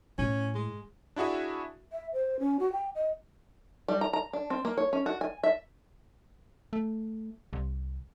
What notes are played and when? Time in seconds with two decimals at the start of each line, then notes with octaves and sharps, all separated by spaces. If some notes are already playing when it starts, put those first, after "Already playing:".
0.18 A2 C#4
0.55 G#3
1.16 D4 E4 F#4 G#4 E5
1.92 E5
2.13 C5
2.40 C#4
2.59 F#4
2.72 G5
2.95 D#5
3.88 G3
4.01 A#5
4.13 A#5
4.33 D4
4.50 C4
4.65 A#3
4.78 C#5
4.93 C#4
5.06 F#4
5.21 G#5
5.43 E5
6.73 A3
7.53 C2